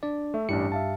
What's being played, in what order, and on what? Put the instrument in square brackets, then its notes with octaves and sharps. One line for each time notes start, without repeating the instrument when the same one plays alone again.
[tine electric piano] D4 D5
[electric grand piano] A3 E5
[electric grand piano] A1 D4 E4 [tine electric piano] G2 G4 C#7
[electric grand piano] E5 F5 A5